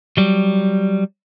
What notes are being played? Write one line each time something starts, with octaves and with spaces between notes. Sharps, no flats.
F#3 G3